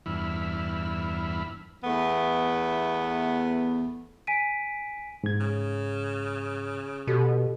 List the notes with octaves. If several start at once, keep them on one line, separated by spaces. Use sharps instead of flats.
E2 G2 E4 B5 E6 F6
E2 A3 B3
G#5 B6 D7 D#7
G#2 G#6
C#3
B2 F#4 G4 A4